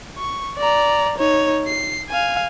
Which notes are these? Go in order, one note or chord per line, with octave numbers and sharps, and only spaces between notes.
C#6
D5 A#5
D#4 C#5
C7
F5 G#5